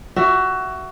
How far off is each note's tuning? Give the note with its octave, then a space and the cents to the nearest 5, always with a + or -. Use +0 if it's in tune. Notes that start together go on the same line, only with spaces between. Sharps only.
F#4 +20 E5 +15